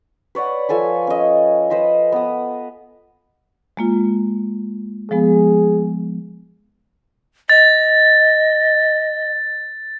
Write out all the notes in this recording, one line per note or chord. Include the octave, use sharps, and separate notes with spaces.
B4 C#5 D5 F#5
F3 A4 G#5 B5
C#4 D#5
B4 C5 D#5 B5
B3 D#6
G#3 A#3 F4
F3 G#3 B3 G#4
D#5 A6